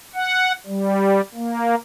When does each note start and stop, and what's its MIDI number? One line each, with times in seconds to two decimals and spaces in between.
0.15 0.52 78
0.66 1.21 55
1.35 1.75 58